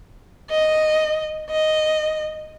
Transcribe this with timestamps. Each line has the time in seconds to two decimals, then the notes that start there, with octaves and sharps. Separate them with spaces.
0.50 D#5
1.50 D#5